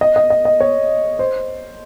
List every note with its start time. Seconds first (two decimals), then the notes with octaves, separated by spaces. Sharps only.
0.01 D#5
0.16 D#5
0.30 D#5
0.45 D#5
0.60 C#5
1.19 C5